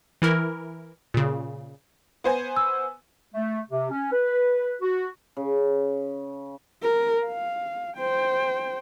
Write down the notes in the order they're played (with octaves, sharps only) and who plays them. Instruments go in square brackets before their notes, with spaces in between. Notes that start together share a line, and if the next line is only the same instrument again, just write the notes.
[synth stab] E3 E4 A#4
A#2 C#3
[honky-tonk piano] B3 C5 G#5
[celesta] E6
[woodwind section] A3
C3
C#4
B4
F#4
[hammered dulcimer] C#3
[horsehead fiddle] A#4
F5
C5 G5